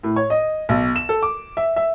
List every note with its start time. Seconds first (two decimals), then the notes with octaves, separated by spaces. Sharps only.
0.03 A2
0.16 C#5
0.30 D#5
0.69 B1
0.96 E7
1.09 A4
1.23 D6
1.57 E5
1.76 E5